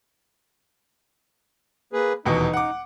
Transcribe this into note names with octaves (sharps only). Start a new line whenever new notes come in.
A#3 G#4 B4
D#1 E2 B2 D#4
F#5 D6